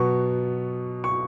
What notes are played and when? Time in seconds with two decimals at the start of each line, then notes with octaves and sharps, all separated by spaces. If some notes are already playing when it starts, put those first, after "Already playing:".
Already playing: B2 F#3 B3 C#6
1.04 C#6